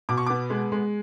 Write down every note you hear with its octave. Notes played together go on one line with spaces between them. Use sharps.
B2 D6
C#6
B3 D6
G#3
G#3